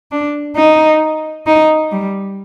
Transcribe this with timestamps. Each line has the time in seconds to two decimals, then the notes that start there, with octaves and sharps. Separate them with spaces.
0.12 D4
0.56 D#4
1.47 D#4
1.92 G3